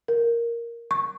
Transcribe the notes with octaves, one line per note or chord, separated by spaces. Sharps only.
A#4
C#6